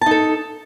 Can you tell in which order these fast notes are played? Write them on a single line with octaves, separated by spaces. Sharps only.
A5 D#4 A4